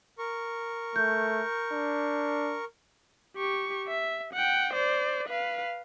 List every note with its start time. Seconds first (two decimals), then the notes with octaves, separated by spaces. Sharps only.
0.18 A#4 C#6
0.96 A3 G6
1.73 D4
3.36 G4 C#6
3.88 E5
4.34 F#5 G5
4.74 C5 D5
5.28 B4 F5